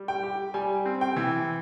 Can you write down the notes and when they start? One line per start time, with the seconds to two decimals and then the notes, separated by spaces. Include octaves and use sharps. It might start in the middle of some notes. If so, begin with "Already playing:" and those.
Already playing: G3
0.08 G5
0.23 G4
0.54 G3 G#5
0.86 C4
1.01 G5
1.17 E3